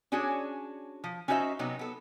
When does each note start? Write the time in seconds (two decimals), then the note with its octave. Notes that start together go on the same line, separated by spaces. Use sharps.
0.12 C#4 D4 F#4 G#4 C#5
1.04 F3
1.28 C#4 D#4 F#4 C5 D#5 E5
1.59 C3 F#3 B3 D#4
1.79 B3 A4